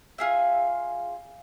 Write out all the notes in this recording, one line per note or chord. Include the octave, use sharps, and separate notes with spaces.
F4 G#4 E5